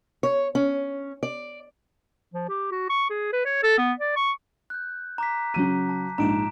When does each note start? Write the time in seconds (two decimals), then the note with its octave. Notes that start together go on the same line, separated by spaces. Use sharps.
0.23 C#5
0.55 C#4
1.23 D5
2.34 F3
2.49 G4
2.71 F#4
2.90 C#6
3.10 G#4
3.32 B4
3.45 C#5
3.63 A4
3.78 B3
4.00 D5
4.16 C#6
4.70 F#6 G6
5.18 A#5 D6 B6
5.54 C#3 F#3 D#7
5.89 A5
6.18 A#1 G#2 A#5 D7 E7